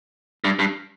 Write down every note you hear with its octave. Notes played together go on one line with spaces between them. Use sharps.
G2
G2